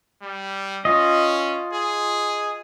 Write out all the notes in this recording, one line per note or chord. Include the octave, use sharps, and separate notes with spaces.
G3
C#4 F4 D#5
G#4